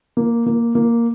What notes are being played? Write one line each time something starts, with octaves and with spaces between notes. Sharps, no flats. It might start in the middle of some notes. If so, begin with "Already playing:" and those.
A#3
A#3
A#3